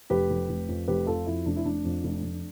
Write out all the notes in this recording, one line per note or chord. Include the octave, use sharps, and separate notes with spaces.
F1 G4 B4
F1
F1
F2
F1 G4 B4
F2 F4 A4
F2 E4
F1 D4
E4
F1 D4
F2
F1
F1